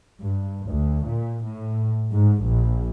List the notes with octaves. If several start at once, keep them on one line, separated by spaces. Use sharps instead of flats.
G2
D2
A#2
A2
G#2
A#1